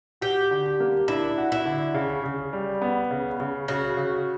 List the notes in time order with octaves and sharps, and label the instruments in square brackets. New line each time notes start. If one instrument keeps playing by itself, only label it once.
[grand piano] F#4 [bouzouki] G4
[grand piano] D3
A#3
[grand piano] D4 [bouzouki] E4
[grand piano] F#4
[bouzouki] E4
[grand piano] D3
C#3
C#3
G3
B3
C#3
C#3
[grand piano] C#3 [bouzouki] F#4
[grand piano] C#3